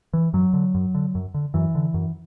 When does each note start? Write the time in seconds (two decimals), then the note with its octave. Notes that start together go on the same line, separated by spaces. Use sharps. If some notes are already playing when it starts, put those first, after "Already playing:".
0.14 E3
0.34 F#2 F#3
0.53 D3
0.74 F#2
0.95 D3
1.15 F#2
1.34 D3
1.54 F#2 E3
1.75 D3
1.94 F#2